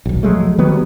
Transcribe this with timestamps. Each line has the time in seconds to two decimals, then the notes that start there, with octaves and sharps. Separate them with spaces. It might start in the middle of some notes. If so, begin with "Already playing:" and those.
0.06 D#1 B1
0.23 F3 F#3 G#3 A3
0.58 D#3 F#3 G3 B3